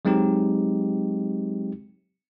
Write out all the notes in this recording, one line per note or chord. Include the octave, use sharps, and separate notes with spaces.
F#3 G#3 C4 D#4 G4